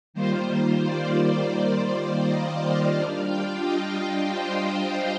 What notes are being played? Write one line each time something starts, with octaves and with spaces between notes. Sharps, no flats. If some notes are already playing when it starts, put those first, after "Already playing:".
D#3 G3 A#3 F4 C5
D5
D5
D#5
F5
G3 D4 F4 F5
G5
D#5
C5